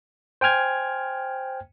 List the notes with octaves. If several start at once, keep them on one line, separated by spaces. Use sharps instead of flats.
C5 G5 G#5 F6 G#6